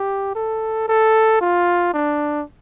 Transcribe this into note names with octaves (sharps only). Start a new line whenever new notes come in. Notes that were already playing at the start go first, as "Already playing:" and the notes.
Already playing: G4
A4
A4
F4
D4